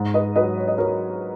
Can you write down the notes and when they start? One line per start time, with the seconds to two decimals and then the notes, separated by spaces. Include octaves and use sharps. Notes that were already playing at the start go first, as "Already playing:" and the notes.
Already playing: G#2
0.14 B4 D#5
0.36 F#3 B4 D#5
0.58 C#5
0.68 D#5
0.78 F#3 A#4 C#5